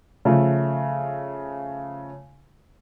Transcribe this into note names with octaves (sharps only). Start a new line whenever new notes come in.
C#3 F3 A3